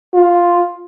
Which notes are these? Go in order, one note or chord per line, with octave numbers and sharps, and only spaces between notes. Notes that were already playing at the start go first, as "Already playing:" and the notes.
F4